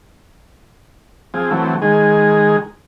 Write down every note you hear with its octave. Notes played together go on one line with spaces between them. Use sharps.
F3 C4 G#4
E3 F#3 A3 C4
D#3 G#3 G#4